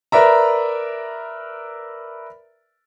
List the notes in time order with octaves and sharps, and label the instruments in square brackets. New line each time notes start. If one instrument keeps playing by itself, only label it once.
[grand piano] A#4 B4 D5 E5 A#5